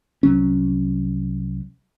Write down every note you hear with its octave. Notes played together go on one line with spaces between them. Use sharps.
C2 F#3 C#4